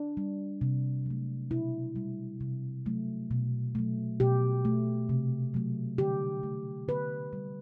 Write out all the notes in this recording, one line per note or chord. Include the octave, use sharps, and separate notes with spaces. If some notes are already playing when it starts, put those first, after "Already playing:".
Already playing: D4
G3
C3
F#3 A3
B2 E4
G3
C3
F#3 A3
B2
F#3 A3
B2 G4
A3
C3
F#3 A3
D3 G4
A3
D3 B4
G3